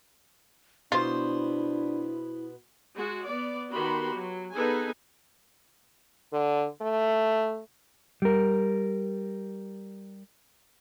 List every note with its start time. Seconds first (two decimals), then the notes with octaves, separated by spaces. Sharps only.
0.92 B2 B3 D4 E4 F4 C5
2.95 G#3 F#4
3.25 B3 D5
3.72 D#3 B3 F#4 G4 B5 C6
4.17 F#3
4.55 B3 D#4 G#4 A4 B4 G#5
6.33 D3
6.81 A3
8.22 G3 A#4